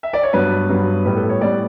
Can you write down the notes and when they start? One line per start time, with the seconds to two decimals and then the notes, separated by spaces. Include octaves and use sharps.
0.03 E5
0.13 D5
0.23 C#5
0.33 G2 F#3 B3 B4
0.69 G2 F#3 B3
1.05 A2 G3 B3 B4
1.17 A4
1.29 C#5
1.41 A2 G3 B3 D5